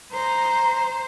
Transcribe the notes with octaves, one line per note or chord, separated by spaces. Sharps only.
C5 A#5